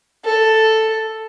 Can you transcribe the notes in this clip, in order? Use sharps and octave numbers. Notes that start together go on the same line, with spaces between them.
A4